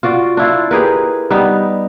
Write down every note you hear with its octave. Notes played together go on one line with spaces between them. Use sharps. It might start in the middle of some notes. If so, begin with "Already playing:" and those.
F4 F#4 D5
D4 E4 F4
G4 G#4 A#4 B4
G3 B3 D#4